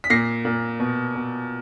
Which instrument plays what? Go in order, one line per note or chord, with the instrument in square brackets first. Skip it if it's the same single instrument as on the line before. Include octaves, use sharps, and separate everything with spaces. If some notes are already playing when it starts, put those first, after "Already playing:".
[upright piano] B6
A#2 A#6 C7
A#2
B2
B2